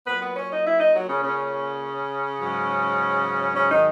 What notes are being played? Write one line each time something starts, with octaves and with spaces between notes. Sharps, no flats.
A#2 F#3 B3 B4
B3 B4
C#4 C#5
D#4 D#5
E4 E5
D#4 D#5
F#3 F#4
C#3 C#4
C#3 C#4
G#2 F#3
C#3 C#4
D#3 D#4